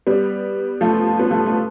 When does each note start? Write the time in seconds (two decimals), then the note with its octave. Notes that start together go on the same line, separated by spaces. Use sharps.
0.07 G3 B3
0.81 F3 A3
1.19 B3
1.31 F3 A3
1.46 A3